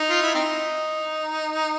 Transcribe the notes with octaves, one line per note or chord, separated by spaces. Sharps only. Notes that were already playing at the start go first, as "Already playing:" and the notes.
Already playing: D#4
F4
E4
C4 D#4